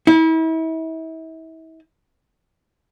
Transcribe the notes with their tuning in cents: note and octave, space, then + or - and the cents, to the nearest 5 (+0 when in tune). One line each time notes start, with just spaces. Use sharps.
E4 -35